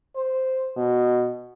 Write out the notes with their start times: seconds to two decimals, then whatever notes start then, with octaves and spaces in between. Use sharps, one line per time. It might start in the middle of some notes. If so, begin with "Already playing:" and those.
0.16 C5
0.77 B2